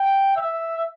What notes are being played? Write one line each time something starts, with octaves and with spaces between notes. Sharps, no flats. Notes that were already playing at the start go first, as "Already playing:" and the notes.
Already playing: G5
E5